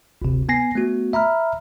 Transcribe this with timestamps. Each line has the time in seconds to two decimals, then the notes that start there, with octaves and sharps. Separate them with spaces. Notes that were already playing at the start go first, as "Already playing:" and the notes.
0.22 G1 D2 C3
0.49 B3 G#5 A#6 C7
0.75 A3 B3 F#4
1.13 E5 A#5 B5 F6